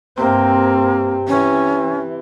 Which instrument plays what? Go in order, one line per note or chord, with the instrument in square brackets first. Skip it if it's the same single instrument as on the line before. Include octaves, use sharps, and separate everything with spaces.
[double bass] G2 C4 [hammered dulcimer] C3 [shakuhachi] A#3
[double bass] E3 [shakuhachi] C#4